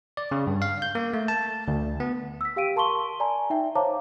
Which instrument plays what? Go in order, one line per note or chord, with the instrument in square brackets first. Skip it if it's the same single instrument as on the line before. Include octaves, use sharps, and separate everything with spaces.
[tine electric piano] D5
C#3
G2
F5
G6
A#3
A3
A5
D2
B3
[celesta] E6 B6
G4 F5 G5 D7 D#7
A#4 A5 C6 C#6 G7
D5 G#5 A#5
D#4 E5 G5
C5 C#5 F5 A5 A#5 D6